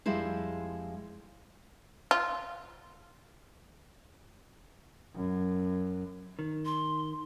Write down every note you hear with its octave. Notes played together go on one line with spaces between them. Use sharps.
F2 G3 G#3 E4 C5
F4
F#2
D#3
C6